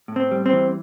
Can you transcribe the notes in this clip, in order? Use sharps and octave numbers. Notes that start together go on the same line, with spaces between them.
A2
C4
G3
C4
E3